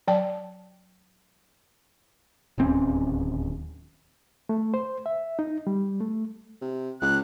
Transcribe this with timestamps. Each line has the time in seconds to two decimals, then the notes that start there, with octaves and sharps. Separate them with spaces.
0.08 F#3 D5 G5 A5
2.58 D1 D#2 C4 C#4
4.49 A3
4.74 C5
5.06 E5
5.39 D#4
5.67 G3
6.01 A3
6.61 C3
7.01 C#2 F#6